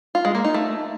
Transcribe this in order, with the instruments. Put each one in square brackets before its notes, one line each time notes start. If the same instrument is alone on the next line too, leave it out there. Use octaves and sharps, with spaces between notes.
[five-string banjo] F4
G#3
A#3
D#4
A3